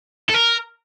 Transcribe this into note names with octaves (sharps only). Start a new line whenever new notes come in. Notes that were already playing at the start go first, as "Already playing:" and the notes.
A4
A#4